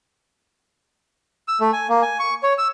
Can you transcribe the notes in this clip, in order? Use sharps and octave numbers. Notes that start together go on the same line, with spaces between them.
E6
A3
G#5
A#3
G#5
C#6
C#5
E6